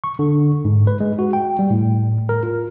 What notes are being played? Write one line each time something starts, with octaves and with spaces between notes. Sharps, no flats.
C#6
D3
G#2
B4
G#3
F#4
G5
G3
A2
A#4
F4